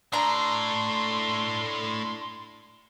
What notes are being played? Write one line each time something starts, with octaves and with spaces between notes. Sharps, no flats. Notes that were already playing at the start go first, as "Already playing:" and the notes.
A2 A3 D4 A#5 C6